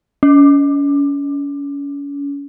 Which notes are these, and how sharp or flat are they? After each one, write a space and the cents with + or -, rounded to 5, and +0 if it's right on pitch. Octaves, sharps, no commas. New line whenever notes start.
C#4 +35